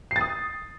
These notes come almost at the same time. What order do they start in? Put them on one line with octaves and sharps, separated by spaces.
C7 A6 D#6